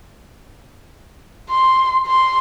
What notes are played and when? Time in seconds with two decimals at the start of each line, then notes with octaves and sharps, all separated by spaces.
1.50 C6
2.07 C6